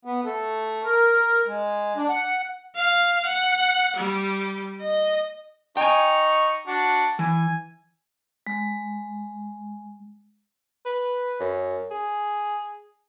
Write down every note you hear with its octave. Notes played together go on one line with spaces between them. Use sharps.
B3
A3
A#4
G#3
D4
F#5
F5
F#5
G3
D#5
D#4 G5 G#5 C#6
D4 F#4
E3 G#5
G#3
B4
F#2
G#4